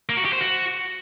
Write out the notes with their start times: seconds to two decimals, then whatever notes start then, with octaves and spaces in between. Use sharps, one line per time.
0.09 A#3
0.17 F#4
0.25 G4
0.33 C5
0.41 F#4